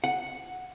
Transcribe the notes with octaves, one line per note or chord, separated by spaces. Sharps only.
F#5